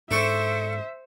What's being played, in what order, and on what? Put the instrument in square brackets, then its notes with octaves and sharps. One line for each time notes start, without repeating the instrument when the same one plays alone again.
[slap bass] G#2 [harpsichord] D4 A4 C#6 [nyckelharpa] C5 [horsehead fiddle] E5